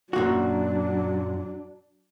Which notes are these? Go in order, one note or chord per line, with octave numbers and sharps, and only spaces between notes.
F#2 A#2 F#3 D4 F#4